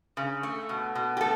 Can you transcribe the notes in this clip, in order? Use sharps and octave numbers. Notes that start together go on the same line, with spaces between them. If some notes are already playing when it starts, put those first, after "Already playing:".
C#3
A3
B2
B2
G4
A3 A4